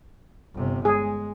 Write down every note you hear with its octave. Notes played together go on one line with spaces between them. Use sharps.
G1 C3
G#3 G#4